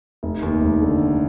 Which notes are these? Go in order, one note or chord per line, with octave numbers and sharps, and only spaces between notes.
F1
D#2
F1
D3